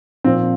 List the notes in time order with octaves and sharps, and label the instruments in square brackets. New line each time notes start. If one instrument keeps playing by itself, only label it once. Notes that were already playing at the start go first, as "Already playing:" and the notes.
[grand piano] A#2 F3 C4